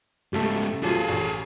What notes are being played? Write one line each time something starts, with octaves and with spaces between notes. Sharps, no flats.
G#2 C#3 G3 A3
C#2 F3 F#3 G#4 A4
A1